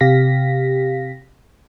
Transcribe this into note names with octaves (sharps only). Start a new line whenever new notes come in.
C3 G4 F5 A#6 B6